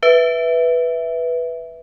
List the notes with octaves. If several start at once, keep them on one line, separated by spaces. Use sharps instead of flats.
B4 E5